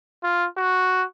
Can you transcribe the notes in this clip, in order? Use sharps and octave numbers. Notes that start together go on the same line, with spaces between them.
F4
F#4